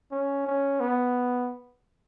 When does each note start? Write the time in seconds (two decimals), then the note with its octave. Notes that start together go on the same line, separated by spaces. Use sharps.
0.12 C#4
0.46 C#4
0.80 B3